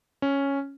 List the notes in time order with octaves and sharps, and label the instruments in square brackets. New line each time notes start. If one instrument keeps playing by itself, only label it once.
[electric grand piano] C#4